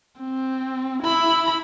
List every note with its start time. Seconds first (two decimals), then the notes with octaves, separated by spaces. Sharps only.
0.20 C4
1.03 E4 B5